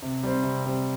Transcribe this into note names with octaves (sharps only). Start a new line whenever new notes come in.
C3
G3 C4
C3
G3 C4